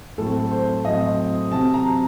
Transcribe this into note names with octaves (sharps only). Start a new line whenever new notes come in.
A2 F#3 C4 A4
C5
A2 F#3 C4 D#5
C3 F#3 C4 A5
A#5